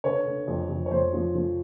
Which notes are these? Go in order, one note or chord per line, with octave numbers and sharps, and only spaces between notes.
D3 B4 C#5
D3
F2
F2
C#5
F2 C5
F3
F3